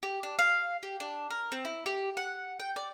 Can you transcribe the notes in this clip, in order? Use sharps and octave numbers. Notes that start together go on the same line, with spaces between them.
G4
D4
F5
G4
D4
A#4
C4
E4
G4
F#5
G5
D5